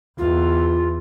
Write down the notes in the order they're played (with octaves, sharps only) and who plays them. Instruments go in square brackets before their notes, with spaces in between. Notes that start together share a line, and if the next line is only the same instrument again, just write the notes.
[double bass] E2 [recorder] F4